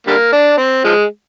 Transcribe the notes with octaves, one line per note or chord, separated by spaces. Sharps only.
D3 G3 A#3
D4
C4
F3 G#3